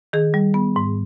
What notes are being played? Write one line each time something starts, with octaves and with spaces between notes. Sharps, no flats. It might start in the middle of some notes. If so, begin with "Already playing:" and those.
D#3 G#4
G3
B3
G#2